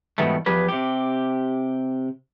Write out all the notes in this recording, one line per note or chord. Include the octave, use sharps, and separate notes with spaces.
G#2 B2 D#3 E3 G3 A3
E2 F3 G4 G#4 B4
C3 G4